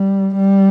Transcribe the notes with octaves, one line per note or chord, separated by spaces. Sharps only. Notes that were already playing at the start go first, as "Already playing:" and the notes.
Already playing: G3
G3